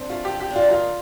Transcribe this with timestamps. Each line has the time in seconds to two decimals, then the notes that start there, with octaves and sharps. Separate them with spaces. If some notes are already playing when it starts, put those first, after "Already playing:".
Already playing: C4 D4
0.10 A3 F4
0.25 G4
0.31 A4
0.40 G4
0.50 D4
0.56 F4
0.70 D#3 F4